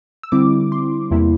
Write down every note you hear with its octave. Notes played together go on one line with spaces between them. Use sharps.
E6
D3 G3 C4 E4 D6
C6
E2 C3 G3 A#3 E4